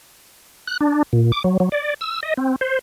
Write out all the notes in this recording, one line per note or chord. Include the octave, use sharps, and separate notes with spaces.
F#6
D4
A#2
D6
F#3
F#3
D5
E6
D#5
C4
C5